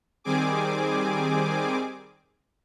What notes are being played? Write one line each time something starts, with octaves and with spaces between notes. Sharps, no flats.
D#3 G3 C4 G#4 G#5 D6